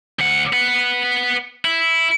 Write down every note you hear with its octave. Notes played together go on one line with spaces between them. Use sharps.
D2 F#5
B4 F#5
E4